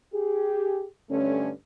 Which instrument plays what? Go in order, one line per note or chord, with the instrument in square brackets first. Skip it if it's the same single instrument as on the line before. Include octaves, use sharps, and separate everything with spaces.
[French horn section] G4 G#4
G2 D3 A3 C#4